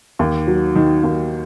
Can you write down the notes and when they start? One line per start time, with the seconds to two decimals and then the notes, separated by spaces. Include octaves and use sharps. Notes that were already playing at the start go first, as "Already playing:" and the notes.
0.19 D#2
0.47 F#3
0.76 D#3
1.04 D#2